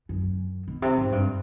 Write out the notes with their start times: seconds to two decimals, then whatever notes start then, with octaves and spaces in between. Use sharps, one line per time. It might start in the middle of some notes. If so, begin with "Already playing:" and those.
0.09 F#2
0.68 B2
0.82 C3
0.97 G#2
1.12 G2